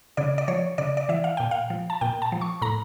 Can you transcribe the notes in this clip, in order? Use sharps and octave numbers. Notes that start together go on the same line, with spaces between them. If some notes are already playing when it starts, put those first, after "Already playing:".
C#3 D5
D5
F3 C#5
C#3 D5
D5
E3 E5
F5
A#2 G5
F5
F3
A5
A#2 G5
A5
F3
C#6
A2 A#5